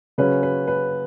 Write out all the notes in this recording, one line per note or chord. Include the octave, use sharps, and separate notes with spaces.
C#3 F#3 C#4 B4
B4
B4